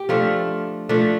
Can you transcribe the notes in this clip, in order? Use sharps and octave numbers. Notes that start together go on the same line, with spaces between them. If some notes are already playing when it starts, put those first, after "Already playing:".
Already playing: G4
F3 A3 D4 F4
F3 A3 D4